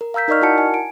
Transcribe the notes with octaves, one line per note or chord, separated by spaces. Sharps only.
A#4
F5 A#5 E6 G6 B6
D#4 A#4 D5 D#5 C#6 F6
E4 F#4 A#4 F#5 A5 C#7
G#5
D7